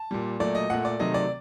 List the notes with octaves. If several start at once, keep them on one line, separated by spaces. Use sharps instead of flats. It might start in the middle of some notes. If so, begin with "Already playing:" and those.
Already playing: A5
A#2 G3
A#2 F#3 A3 D5
D#5
A#2 A3 F#5
D5
C3 D#3 F#3 A3 D#5
D5